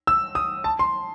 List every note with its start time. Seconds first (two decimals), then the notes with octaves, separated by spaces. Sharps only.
0.07 E6
0.35 D#6
0.64 A5
0.79 C6